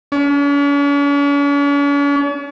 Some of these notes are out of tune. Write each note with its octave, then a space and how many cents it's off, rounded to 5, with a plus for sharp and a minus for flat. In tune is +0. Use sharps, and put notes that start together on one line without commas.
C#4 +45